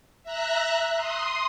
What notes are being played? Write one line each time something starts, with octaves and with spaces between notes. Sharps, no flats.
E5 A#5 F#6
C6 D#6